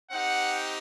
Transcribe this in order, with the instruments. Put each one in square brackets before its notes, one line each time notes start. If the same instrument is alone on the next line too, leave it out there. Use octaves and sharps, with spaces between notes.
[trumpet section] C4 D#4 G4 F#5